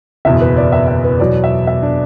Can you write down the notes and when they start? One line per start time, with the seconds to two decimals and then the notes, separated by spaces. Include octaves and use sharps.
0.25 F#1 E2 B2 E5
0.41 B4
0.57 D5
0.72 E5
0.88 E5
1.04 B4
1.20 E2 B2 F#3 D5
1.44 E5
1.67 E5
1.83 D4